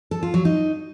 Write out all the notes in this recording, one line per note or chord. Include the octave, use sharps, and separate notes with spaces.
A4
F4
F#3
D#4